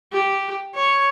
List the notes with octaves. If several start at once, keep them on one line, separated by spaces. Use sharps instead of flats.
G4
C#5